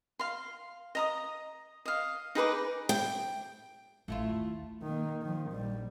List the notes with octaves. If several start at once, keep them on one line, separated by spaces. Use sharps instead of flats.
F5 C6
D#5 A#5 D#6
D#5 F5
D#4 G#4 B4 D6
G5
A1 A3 E4 F4
D#2
D#3 A#3
D#3 F3
A#1 G3